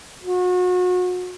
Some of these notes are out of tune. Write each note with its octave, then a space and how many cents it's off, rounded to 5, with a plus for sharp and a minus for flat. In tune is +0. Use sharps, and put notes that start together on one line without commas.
F#4 -35